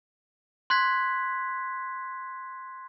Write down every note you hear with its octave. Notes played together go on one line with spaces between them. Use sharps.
C6 F#6 G#6 B6